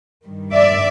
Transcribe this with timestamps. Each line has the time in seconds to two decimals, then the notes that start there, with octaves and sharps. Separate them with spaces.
0.24 G2 D#3 G3
0.54 D5 E5